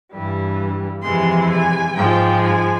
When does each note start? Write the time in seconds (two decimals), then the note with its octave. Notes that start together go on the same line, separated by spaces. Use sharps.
0.12 G2 E3 G3
1.04 F2 C3 E3 G#3 C6
1.51 G#5
1.96 G#2 F3 G#3 G5
2.42 G#5